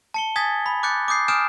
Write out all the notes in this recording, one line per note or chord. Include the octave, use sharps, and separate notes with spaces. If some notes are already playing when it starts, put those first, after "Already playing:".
A5 C#7 G7
G#5 D#6 G#6 A6 B6
B5
D6 F#6 G6 A6 C#7
D6 D#6 G6 C7
G#5 D#6 F6 G6 D7 E7